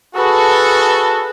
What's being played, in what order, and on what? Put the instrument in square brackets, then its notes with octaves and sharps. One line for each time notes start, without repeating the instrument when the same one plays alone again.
[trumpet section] F#4 A4 [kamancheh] G#4 B4